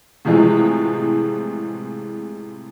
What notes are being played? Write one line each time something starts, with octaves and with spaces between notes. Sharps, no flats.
A2 C3 E3 F3 G#3